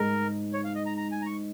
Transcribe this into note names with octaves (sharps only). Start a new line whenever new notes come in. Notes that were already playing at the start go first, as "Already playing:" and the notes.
Already playing: G#2 G#3 D#4 A#4 D#5
C#5
F5
D#5
A#5
A#5
G#5
A#5
C#6